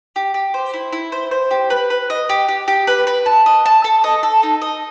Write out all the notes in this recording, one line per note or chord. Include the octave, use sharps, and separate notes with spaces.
G4
G4
C5
E4
E4
C5
C5
G4
B4
B4
D#5
G4
G4
G4
B4
B4
A5
D#5
A5
A4
D#5
A4
D#4
D#5